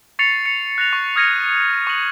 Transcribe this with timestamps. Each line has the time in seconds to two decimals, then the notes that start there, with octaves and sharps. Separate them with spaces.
0.19 C#6 A6 C7 C#7 F7
0.46 C#7
0.78 F#6 A#6 F7
0.93 C#6
1.16 D#6 F6 G#6 A#6 C#7 D#7
1.87 C#6 F#7